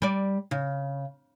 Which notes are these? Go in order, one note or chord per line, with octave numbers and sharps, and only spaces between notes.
G3 D5
C#3